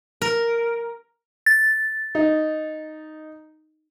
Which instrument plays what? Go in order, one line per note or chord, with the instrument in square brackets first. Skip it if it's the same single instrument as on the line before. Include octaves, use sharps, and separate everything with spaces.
[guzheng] A#4
[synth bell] A6
[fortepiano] D#4